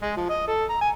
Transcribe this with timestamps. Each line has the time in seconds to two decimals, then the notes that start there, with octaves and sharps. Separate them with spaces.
0.02 G#3
0.17 F3
0.29 D#5
0.47 A4
0.69 A#5
0.81 G#5